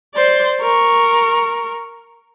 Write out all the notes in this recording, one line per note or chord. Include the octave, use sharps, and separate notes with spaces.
C5 D5
A#4 C#6